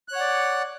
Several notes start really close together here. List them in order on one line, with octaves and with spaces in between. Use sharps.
F#6 C#5 F#5 D5